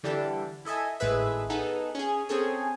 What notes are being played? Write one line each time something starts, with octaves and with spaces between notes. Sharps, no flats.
D3 E3 G3 D4 G4 A4
E4 A4 D#5 E5 G#5
G#1 A2 G#3 G#4 B4 E5
B3 D#4 G#4 A4 B4
C#4 G#4
C4 C#4 G#4 A4 C#5